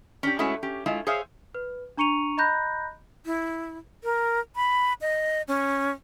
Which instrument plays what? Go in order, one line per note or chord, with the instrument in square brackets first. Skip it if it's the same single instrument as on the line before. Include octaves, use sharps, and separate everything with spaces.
[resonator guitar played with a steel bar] C#4 D4 G4
G#3 A3 C#4 E4 F#4
C#4 G4
G#3 A3 E4 F4
G#4 C5 C#5 E5 F5
[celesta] B4
D4 A#5 C#6 C#7 D#7 F7
D#5 A#5 B5 F#6 G6 A#6
[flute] E4
A#4
B5
D#5
C#4